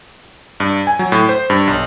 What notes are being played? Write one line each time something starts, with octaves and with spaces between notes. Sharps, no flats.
G2
G#5
F#3
A2
C5
G2
B1